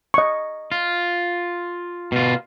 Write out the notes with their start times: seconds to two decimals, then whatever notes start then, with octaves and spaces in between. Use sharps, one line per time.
0.14 D#5 C#6
0.72 F4
2.12 B2 F4